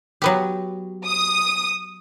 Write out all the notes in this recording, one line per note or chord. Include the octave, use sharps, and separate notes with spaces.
F#3 B3 G4
D#6